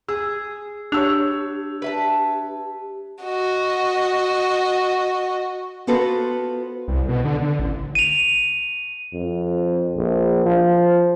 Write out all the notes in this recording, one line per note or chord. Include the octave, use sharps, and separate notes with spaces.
G#4 E6
D4 G4 C#5 E6 F7
B4 E5 A5
F#4 D#5
B3 F4 F#4 A4 B4 C5
C2
B2
D3
D3
A1
D#7 F7
F2
A#1
F3